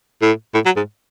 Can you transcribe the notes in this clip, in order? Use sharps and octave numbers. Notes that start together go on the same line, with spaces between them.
A2
A2
F#3
G#2